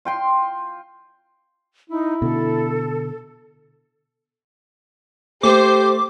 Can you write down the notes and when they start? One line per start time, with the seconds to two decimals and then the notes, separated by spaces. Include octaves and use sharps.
0.05 F4 G5 C6
1.90 D#4 E4
2.22 B2 D3 A4
5.43 A3 G4 C5 D6